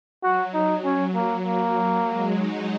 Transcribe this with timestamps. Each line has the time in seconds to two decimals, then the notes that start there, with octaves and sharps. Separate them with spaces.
0.23 F#3 F#4
0.53 D#4
0.84 F#3 C#4
1.14 A#3
1.45 A#3
2.06 G#3
2.35 D#4